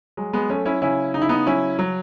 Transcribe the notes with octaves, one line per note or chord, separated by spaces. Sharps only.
F#3 G#3
G#3 B3
F#3 A3 C#4
C#4 E4
C#3 C#4 E4
C#3 D#4
E4
B3 D#4
F#3 C#4 E4
F#3